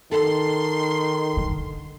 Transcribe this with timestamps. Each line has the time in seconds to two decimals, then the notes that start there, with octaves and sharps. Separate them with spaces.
0.12 D#3 A4 C6
1.37 D3